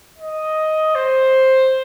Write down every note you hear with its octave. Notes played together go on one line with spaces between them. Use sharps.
D#5
C5